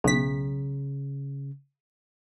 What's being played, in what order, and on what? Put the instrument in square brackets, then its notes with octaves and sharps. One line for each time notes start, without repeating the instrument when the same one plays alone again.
[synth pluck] B1 B6 [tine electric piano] C#3